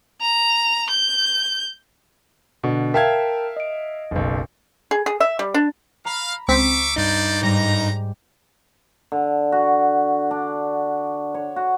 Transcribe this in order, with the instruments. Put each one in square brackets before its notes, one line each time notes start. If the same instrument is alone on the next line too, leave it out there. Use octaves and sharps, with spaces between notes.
[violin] A#5
G6
[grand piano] B2 D3
[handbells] A#4 G5 A5 [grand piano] E5 F5 G#6
[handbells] D#5 D7
[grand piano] F#1 B1
[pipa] G#4
G#4
E5
G3
D4
[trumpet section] F5 [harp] A#5 B5
[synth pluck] C#2 C4 B6 [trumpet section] E5 C#6 D6
[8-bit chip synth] G2 D#4 [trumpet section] C5 D5
[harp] G#2 G3 [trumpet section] A#5
[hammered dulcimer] D3
F#4
D4
C#5
F#4